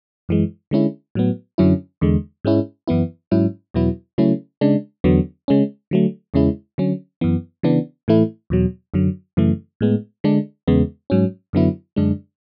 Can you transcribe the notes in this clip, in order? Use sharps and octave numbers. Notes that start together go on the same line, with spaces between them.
F#2 E3 G#3
D3 G#3 C#4 E4
A2 F#3 B3
F#2 D3 F#3 C#4 E4
E2 D3 G#3
G#2 G#3 C#4 E4
F#2 E3 B3 E4
G#2 F#3 C#4 E4
E2 B2 F#3 B3 E4
C#3 F#3 A3 C#4 E4
C#3 G#3 D4
E2 D3 F#3 B3
C#3 G#3 C#4
D3 F#3 A3
E2 C#3 G#3 C#4 E4
D3 F#3 C#4
F#2 E3 B3
C#3 E3 B3 D4
A2 E3 A3 E4
E2 B2 F#3
F#2 D3 F#3
F#2 C#3 E3 A3
A2 G#3 B3
D3 G#3 D4
E2 C#3 G#3 B3
G#2 F#3 C#4
F#2 D3 F#3 B3 E4
F#2 D3 G#3 D4